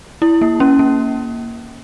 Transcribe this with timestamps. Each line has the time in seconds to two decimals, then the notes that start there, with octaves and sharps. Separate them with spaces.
0.22 E4
0.41 A#3
0.60 C#4
0.79 A#3